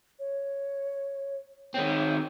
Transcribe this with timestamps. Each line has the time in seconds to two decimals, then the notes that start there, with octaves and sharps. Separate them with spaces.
0.19 C#5
1.74 D#3 C4 C#5